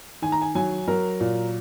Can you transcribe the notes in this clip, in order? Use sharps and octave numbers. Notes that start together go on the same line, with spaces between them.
D#3 G#5
A#5
G#5
F#3 G#5
F#3 A#4
A#2